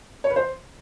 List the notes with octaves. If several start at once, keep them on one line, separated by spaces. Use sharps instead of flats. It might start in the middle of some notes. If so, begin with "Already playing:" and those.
C#5
B4
C5